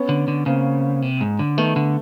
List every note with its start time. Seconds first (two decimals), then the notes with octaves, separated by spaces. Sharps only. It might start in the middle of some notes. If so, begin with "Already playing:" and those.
Already playing: B3 C#4
0.09 D3
0.28 D3
0.46 C#3 A#3 C4
1.02 C3
1.21 G#2
1.39 D3
1.57 D#3 A3 B3
1.76 D3